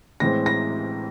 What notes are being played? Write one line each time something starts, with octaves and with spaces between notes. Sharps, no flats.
A2 E3 G#3 C4 A#6
A#6